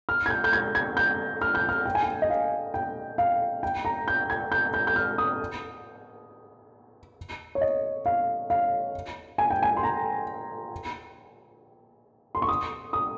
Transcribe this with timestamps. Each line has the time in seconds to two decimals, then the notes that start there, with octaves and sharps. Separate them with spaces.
0.09 F6
0.26 G#6
0.30 G6
0.44 G6
0.53 G#6
0.75 G#6
0.97 G6
1.42 F6
1.55 G6
1.69 F6
1.85 G5
1.95 G#5
2.04 G5
2.22 D#5
2.30 F5
2.74 G5
3.18 F5
3.63 G5
3.85 A#5
4.08 G6
4.30 G#6
4.52 G6
4.74 G6
4.87 G6
4.96 F6
5.18 D#6
7.55 C#5
7.61 D#5
8.06 F5
8.50 F5
9.38 G#5
9.50 G5
9.62 G#5
9.77 C6
9.83 A#5
12.35 C6
12.42 C#6
12.48 D#6
12.93 D#6